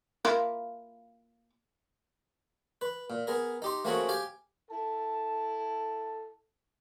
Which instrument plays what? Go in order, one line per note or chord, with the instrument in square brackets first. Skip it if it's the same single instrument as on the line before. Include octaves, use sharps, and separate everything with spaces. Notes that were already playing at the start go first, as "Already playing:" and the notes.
[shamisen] A#3 E4 F4
[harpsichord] B4
A#2
B3 G#4 A#4
D#4 G4 C6
A3 A#3 C4 C#4 F#4 G#4
G4 F5 G5 G#5
[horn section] E4 A4 A5